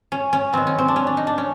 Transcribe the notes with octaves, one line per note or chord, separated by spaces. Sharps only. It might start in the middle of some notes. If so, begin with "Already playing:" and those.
C#4
C#4
D#3 F#3 B3 C4
C#4
C4
D4
C#4
D4
D#4
D4
C#4